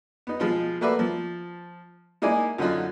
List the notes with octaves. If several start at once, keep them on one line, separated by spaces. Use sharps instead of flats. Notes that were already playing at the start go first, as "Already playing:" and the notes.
B3 D#4
B2 F3 G#3 F4
A3 A#3 F#4 B4 D5 E5
F3
G#3 A#3 D#4 E4 D5 G#5
F#2 D3 C#4 D#4 F4 F#4